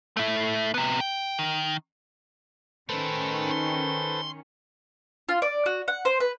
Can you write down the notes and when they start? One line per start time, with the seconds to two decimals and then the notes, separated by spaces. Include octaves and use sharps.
0.17 A3 E4
0.74 C3 B3
1.00 G5
1.39 D#3
2.89 D#3 A3 C#4 E4 A4 B4 C5
3.51 C6
5.29 F4
5.42 D5
5.66 F#4
5.88 F#5
6.05 C5
6.20 B4